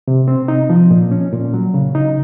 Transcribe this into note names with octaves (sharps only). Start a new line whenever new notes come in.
C3
C4
D#4
F3
A#2
C#4
A#2
F#3
C#3
D#4